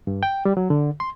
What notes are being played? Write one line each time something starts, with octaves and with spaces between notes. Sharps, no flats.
G2
G5
G3
F#3
D3
C6